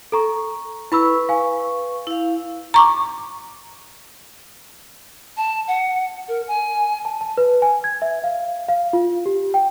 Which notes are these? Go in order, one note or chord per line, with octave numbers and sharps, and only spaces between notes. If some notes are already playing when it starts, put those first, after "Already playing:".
A4 A#5 C#6
E4 B4 B5 C#6 E6
F5 G#5
E4 F5
A#5 C#6 D6
A5
F#5
A#4
G#5
A5
A5
B4
G#5
G#6
E5
F5
F5
F4
G4
G5